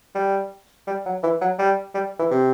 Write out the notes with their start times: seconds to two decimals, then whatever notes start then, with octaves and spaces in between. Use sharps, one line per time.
0.15 G3
0.87 G3
1.06 F#3
1.23 E3
1.41 F#3
1.59 G3
1.95 G3
2.19 E3
2.31 C3